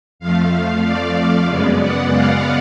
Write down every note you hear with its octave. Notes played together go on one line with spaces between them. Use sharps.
F2 F3 A3 F5
D5
F#2 C#3 G#3 B3
F#5
F5